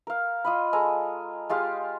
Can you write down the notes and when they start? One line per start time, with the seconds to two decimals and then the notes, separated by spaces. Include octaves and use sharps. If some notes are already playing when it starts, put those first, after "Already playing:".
0.07 A#4 F5
0.45 F4 D#5 B5
0.73 G#3 A4 G#5 A#5
1.49 G#3 F4 G4 F5